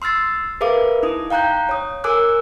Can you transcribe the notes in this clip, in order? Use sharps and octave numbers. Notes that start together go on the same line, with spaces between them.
C6 E6 F6 A6 C7
G#4 A#4 B4 E5 F5 D6
D#4 E4 D#6
F5 G5 A#5 F#6 G6
C#5 D#6
A#4 G#5 D6 E6 F#6